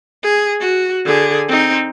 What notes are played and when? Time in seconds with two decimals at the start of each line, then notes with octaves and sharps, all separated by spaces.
0.23 G#4
0.61 F#4
1.05 D3 G#4
1.48 C4 D#4